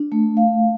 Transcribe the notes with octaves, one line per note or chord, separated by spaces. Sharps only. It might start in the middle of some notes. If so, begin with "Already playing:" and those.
Already playing: D4
A3
F5